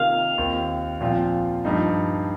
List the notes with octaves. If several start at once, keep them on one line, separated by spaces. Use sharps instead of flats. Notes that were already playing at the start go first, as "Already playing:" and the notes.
Already playing: C3 D#3 A#3 F4 F5
D#2 D#3 C4 F4
A#2 F3 C4 F4
G2 F3 D#4